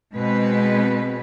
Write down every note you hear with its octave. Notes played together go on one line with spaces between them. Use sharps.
B2 G#3 C4 B4